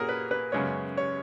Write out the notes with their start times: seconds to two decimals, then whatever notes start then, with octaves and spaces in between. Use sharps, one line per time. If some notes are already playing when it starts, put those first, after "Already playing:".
Already playing: A#2 A#3 C#4 F#4 G#4 A#4
0.09 B4
0.31 B4
0.52 F#2 C#3 G#3 B3 C#5
0.97 C#5